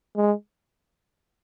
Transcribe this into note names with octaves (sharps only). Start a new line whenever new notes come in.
G#3